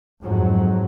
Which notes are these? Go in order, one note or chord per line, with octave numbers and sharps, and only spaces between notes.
F2 G#2 F#3